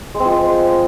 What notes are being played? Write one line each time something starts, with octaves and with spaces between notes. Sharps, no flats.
G#3
C4
F3
G#3